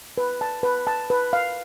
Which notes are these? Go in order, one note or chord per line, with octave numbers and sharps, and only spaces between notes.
B4
A5
B4
A5
B4
F5